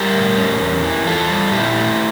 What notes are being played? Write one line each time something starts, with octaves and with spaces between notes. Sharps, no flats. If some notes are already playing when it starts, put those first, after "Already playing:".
Already playing: G3 G4 A#4
A2
C#4
E2
E3
E2 F4 A4
G3
A#2 E4 G4
A3